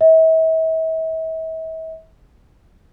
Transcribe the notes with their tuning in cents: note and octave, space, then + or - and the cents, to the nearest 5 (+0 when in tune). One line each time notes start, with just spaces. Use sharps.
E5 -40